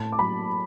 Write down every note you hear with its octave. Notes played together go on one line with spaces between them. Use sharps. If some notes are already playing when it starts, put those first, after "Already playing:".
Already playing: A2 A5
D6
F#3 B5